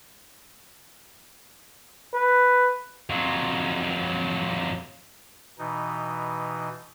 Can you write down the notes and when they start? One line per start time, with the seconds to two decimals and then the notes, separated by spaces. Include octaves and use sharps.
2.14 B4
3.10 F2 F#3
5.59 B2 E3 D#4